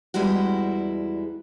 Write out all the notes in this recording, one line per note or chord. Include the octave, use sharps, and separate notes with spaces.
E2 G3 G#3 E4 F#4